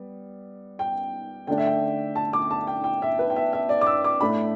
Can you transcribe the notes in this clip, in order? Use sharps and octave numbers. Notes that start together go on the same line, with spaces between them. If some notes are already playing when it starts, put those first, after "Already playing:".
Already playing: G3 B3
G5
D3 A3 D4 G5
E5
G5
A5
D6
A5
G5
G5
E5
B4
G5
E5
E5
D5
D6
E6
D6
A2 A3 D4 B5